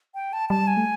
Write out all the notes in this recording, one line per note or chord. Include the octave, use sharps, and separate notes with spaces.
G5
A5
G3 A5
G#5
A3